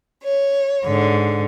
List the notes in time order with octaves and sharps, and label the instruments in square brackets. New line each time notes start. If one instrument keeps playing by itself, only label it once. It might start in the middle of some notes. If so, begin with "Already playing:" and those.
[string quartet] C#5
[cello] G#2 D3